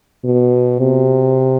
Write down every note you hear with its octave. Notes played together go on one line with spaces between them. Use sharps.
B2
C3